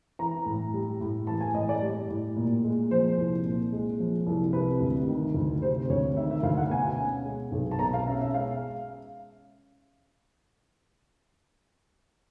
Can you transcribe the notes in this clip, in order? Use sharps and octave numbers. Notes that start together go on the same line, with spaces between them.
E3 A#5
A2
G3
A2
E3 A5
G#5
A2 D#5
D5
G3
A2
A#2
G#3
F3 C5
C2
A#2
G#3
F3
C2
C3 B4
D2
D#3
D2
C3 C5
D2 C#5
D#3 E5
E5
D2 F5
F#5
B2 G#5
C#4
G#3
B1
A5
B2 A#5
F5
C#4 E5
E5
G#3 F5